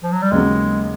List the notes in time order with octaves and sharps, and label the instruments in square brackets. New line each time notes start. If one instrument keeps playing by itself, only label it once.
[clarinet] F3
F#3
G3
[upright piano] D#2 C#3 F#3 B3 [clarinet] G#3